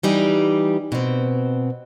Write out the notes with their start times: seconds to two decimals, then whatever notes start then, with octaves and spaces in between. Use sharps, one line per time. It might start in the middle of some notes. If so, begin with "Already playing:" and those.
0.03 E3 G3 D#4 G4
0.92 B2 C4